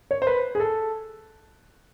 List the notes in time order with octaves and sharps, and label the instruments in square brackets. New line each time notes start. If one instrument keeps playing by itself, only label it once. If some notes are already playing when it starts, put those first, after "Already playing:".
[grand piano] C#5
C5
B4
G#4
A4